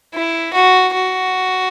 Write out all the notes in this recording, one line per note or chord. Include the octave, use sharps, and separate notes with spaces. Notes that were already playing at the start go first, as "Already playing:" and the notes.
E4
F#4
F#4